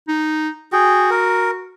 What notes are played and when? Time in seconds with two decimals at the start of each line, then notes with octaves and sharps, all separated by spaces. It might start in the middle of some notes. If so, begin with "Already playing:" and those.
0.08 D#4
0.73 F#4 G#4 G5
1.10 A#4